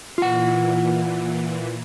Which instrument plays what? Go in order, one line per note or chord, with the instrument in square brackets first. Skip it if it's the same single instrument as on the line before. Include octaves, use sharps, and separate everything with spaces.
[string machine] A#2 E3 [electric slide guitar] F4 F#5